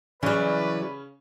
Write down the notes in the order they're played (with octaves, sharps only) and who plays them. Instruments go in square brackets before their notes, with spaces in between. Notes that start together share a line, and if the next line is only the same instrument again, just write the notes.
[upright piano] C#3 C#4 [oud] E3 F#3 [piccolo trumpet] B4 [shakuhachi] D5